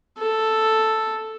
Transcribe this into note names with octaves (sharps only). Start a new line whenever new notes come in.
A4